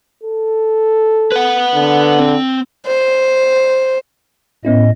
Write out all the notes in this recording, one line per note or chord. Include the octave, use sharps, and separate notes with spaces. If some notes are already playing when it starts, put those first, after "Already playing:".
A4
B4 F#5
D3
C4
C5
A2 B3 C#4 E4 D#5